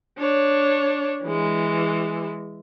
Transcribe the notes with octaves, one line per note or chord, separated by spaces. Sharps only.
D4 C#5
E3 G#3